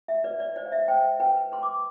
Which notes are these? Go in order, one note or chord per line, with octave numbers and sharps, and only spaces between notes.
E5
B4 D5
D5
C5 D5
F5
E5
C5 G5
B4 G5
B4 C6
D6